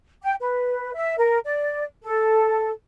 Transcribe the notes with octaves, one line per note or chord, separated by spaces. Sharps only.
G5
B4
E5
A#4
D5
A4